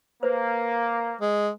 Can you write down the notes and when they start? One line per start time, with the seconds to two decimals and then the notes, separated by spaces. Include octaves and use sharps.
0.23 A#3 B4 C5
1.21 G#3